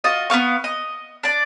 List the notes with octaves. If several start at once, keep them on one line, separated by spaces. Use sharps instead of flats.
F4 F#4 D#5
B3 C4 F5 C#6
D#5
D4 D5